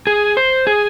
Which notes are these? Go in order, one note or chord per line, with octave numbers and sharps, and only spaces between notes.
G#4
C5
G#4